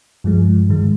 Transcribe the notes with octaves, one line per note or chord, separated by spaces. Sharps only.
G2 F3 G#3
G#2 D#3 G#3